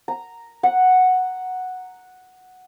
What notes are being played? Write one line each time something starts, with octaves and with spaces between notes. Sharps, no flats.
A#5
F#5